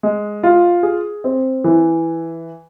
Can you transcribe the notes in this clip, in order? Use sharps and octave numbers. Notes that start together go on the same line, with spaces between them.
G#3
F4
G#4
C4
E3